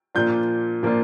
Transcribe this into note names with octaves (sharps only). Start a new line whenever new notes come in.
A#2 F3 A#3 D4 F4 G6
A#2 F3 A#3 D4 F4